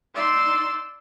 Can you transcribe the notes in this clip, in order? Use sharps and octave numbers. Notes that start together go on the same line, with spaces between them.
D#4 D5 C6 E6